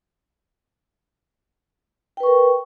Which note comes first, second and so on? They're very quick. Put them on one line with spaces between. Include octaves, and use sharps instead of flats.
G5 B4 C#6 A#4